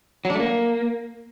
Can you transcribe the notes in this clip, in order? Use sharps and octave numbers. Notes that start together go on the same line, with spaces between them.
F#3
D4
A3
A#3